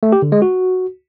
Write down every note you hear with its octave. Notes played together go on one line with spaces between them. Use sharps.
A3
G4
D3
G#3
F#4